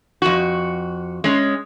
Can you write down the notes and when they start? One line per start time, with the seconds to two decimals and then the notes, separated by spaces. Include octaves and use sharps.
0.22 F2 F#4
1.24 G#3 C#4